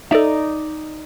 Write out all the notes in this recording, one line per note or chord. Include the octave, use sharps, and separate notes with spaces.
D#4 A4 D5 E5